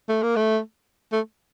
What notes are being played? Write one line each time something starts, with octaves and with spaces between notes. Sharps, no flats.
A3
A#3
A3
A3